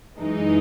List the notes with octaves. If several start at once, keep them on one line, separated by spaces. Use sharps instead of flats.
F#2 E3 G#3 D#4